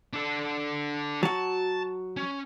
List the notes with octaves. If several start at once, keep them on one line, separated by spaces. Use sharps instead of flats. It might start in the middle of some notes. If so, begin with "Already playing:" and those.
D4 A4
F#3 F#4 A5
C#4